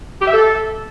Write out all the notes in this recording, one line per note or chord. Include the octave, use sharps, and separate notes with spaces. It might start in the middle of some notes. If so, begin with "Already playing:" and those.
G4
E5
A4